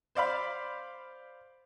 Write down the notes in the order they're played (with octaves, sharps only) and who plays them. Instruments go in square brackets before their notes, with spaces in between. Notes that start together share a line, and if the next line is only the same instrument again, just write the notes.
[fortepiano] C5 D5 F5 B5